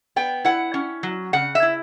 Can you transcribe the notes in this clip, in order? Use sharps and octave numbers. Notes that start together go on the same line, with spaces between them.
B3 G5
E4 F#5
C#4
F#3
C#3 F#5
E5
E4